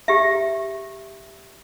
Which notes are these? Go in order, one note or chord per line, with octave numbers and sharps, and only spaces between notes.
G4 E5